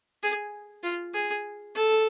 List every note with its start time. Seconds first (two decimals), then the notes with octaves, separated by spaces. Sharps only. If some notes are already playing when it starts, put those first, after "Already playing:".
0.23 G#4
0.83 F4
1.13 G#4
1.75 A4